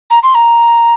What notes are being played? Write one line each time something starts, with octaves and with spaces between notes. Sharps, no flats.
A#5
C6
A#5